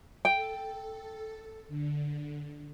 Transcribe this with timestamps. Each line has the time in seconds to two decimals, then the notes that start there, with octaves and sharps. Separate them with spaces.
0.25 A4 G5
1.68 D3